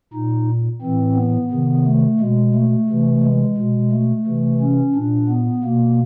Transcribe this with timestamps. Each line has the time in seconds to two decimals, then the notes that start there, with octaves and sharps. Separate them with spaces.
0.14 A#2 D#4
0.82 A2 E3 C4
1.17 B3
1.51 C3 D#3
1.86 A3
2.20 B2 G#3
2.54 A3
2.89 C3 E3
3.23 G#3
3.57 B2
3.92 A3
4.27 C3 E3
4.60 C#4
4.95 A#2 D4
5.29 B3
5.63 B2 A#3